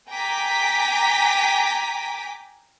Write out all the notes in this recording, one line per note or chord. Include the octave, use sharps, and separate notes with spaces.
G5 G#5 A#5 D6 B6